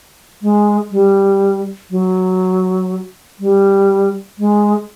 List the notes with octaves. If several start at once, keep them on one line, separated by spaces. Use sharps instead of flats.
G#3
G3
F#3
G3
G#3